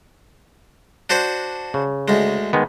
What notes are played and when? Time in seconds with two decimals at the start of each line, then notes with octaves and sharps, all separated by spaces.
1.10 D4 F#4 C5
1.74 C#3
2.08 D2 G#3
2.53 D#3 G#3 B3